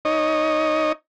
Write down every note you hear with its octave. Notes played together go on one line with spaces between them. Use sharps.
D#4 C#5 D#5